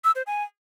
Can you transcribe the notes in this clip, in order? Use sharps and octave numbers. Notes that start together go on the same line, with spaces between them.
E6
C5
G#5